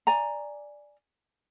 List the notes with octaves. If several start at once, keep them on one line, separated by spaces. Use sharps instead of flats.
D5 G#5 A#5